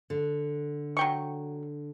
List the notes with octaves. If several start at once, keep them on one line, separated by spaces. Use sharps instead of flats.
D3
F#3 G5 C#6